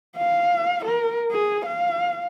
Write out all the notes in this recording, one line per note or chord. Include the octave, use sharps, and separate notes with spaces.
F5
A#4
G#4
F5